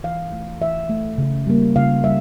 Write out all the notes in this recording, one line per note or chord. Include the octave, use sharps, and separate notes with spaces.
E3 F5
A3
E3 E5
A3
C#3
G3 A#3
C#3 F5
G3 E5